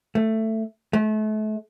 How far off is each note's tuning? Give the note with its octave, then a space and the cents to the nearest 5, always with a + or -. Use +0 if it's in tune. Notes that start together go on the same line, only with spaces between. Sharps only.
A3 +10
A3 -35